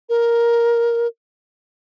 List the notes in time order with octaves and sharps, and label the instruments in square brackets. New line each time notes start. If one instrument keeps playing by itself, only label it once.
[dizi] A#4